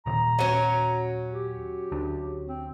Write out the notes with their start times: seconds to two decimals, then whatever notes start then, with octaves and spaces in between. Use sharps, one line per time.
0.06 D#2 A#2 D#3 A#5
0.39 F#3 C#4
1.32 G4
1.92 D2 D4
2.48 C4